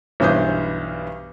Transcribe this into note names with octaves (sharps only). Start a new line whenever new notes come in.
B1 G2 E3 C5 D#6 G6